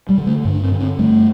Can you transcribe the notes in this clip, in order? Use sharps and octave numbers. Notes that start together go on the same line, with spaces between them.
G3
D3
A3
G2
D4
C4
D3
C4
G2 A3